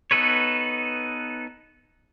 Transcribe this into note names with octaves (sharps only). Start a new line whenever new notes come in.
B3 D#4 A4 B4 C#5